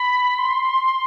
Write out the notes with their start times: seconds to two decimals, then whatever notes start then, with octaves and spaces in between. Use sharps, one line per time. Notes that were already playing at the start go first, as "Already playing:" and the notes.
Already playing: B5
0.38 C6